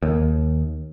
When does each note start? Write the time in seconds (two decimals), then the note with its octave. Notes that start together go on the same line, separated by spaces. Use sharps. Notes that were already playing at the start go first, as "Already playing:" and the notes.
0.02 D#2